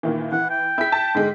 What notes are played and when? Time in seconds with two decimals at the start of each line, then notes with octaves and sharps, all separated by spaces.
0.03 A#2 D#3 E3
0.32 E3 F#5
0.50 G5
0.78 E4 G#4 B6
0.92 A5
1.15 G#2 D3 G#3